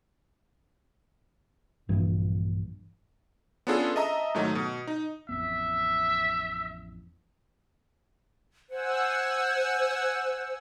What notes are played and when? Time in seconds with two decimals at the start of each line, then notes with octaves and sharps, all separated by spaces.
1.89 A#1 G2 E3
3.67 B3 C#4 D4 F4 G#4 A4
3.96 D#5 E5 A5 A#5 D#6
4.35 G#2 D#3 F#3 A3 D#4
4.55 B2
4.87 D#4
5.29 A1 F2 B3 E5
8.70 C5 F#5 G#5 E6